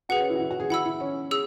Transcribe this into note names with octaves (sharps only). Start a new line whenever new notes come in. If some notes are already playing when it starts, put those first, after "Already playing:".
F#4 G#4 B4 F#5
C#4
E4
F#4
E4
F#4
G#4
E4 F#5 B5 E6
E4
C#4
G#4 E6